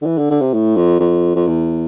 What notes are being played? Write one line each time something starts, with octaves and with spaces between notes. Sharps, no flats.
D3
E3
D3
D3
C3
A2
F2
F2
F2
E2